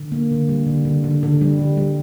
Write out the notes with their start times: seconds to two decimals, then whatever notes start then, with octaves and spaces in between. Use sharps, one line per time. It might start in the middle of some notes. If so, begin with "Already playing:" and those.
Already playing: D3
0.12 A#3
0.31 D3
0.49 G3
0.67 D3
0.85 D3
1.04 D3
1.23 D3
1.41 G3
1.59 D3
1.77 G3